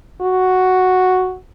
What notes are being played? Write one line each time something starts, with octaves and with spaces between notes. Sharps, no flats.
F#4